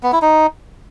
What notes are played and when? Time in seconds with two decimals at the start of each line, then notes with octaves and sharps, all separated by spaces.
0.03 B3
0.12 E4
0.22 D#4